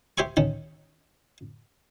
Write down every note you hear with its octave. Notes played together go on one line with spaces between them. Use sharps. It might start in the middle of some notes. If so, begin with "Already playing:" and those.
G4 C5 E5 G#5 C#6
D#3 C#4